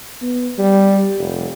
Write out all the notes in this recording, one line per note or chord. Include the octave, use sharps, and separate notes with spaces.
B3
G3
F1